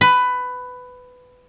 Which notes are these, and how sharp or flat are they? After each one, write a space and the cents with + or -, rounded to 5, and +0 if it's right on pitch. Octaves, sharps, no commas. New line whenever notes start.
B4 +15